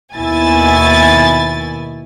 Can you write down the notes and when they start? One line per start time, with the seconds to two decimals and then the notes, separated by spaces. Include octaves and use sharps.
0.14 D#2 B2 E4 G#5 A6